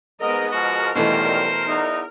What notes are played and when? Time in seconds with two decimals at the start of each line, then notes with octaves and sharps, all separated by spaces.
0.20 G#2 B3 A#4 D#5
0.52 B2 F3 G#3 F#4 A#4
0.95 C#2 B2 D#3 E3 G3 A3 C5
1.65 E2 D#4